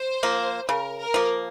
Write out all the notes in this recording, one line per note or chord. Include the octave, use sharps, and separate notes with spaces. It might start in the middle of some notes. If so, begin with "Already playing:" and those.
Already playing: C5
F3 A#3
C#3 A#4
A#4
F3 A#3